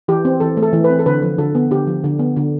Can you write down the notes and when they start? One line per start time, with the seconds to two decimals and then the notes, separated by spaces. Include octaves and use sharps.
0.08 E3 G4
0.25 C4
0.40 E3 A4
0.57 A3
0.63 A4
0.73 E3
0.84 B4
0.90 C4
0.99 A4
1.06 D3 B4
1.22 F3
1.38 D3 A4
1.55 B3
1.71 D3 G4
1.87 F3
2.04 D3
2.19 B3
2.37 D3